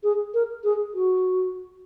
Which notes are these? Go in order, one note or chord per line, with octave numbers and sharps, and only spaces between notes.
G#4
A#4
G#4
F#4